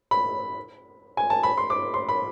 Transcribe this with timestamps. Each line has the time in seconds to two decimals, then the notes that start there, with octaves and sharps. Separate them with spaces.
0.11 B5
1.17 G#5
1.30 A5
1.43 B5
1.58 C6
1.70 D6
1.94 C6
2.09 B5